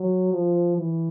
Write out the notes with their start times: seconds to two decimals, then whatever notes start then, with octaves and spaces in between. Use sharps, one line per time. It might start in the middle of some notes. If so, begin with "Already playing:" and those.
Already playing: F#3
0.32 F3
0.78 E3